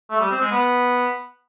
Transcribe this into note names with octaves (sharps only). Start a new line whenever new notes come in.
A3
G3
C4
G#3
B3